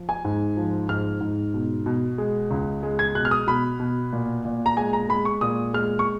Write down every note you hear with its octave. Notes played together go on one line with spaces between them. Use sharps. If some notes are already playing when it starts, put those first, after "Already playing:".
Already playing: F3
G#5
G#2
F3
G#2 F6
G#2
B2
B2
G#3
C#2
G#3
G#6
B2 F#6
F6
D#6
B2 B5
B2
A#2
A#2
A#5
G#3 G#5
A#5
G#3 B5
C#6
A#2 D#6
G#3 F6
C#6